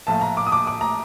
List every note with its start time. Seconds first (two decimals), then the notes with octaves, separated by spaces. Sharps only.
0.07 A#1 A2 F3 A5
0.21 A#5
0.37 D6
0.46 D#6
0.52 D6
0.67 D6
0.81 A#5